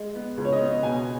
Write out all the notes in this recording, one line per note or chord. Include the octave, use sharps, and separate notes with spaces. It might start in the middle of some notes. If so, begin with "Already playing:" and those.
Already playing: G#3
B3
C#2
C#5
D#5
B3
B2 G#5